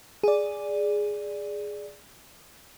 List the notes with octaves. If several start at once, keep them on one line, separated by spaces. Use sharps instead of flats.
G#4 D5